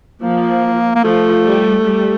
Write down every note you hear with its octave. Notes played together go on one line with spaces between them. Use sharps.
F3 A#3
A#3
F3 A3
G3
G3